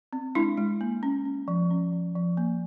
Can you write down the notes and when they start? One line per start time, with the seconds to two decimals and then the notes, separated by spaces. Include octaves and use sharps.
0.13 C4
0.35 G#3 D4 E4
0.57 G#3
0.81 A#3
1.03 C#4
1.26 C#4
1.48 F3
1.70 C#4
1.92 F3
2.15 F3
2.37 A#3